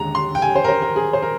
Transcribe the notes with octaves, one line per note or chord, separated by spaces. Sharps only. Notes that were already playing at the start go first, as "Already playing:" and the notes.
Already playing: D#2 D3 G#3 A#5
C6
G5
G#5
C5
A#4
C5
A#4
G#4
C5
A#4